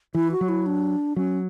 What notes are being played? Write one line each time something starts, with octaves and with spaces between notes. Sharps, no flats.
E3 E4
F#4
F#3
E4
D4
F#3 C#4